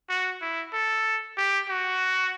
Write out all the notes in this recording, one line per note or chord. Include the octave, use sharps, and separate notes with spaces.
F#4
E4
A4
G4
F#4